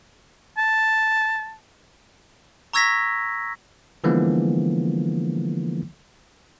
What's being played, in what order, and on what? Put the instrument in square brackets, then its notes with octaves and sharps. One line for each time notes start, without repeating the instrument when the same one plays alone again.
[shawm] A5
[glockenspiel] A#5 C#6 E6 G#6 A#6 B6
[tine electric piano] D3 E3 F3 G#3 A#3 B3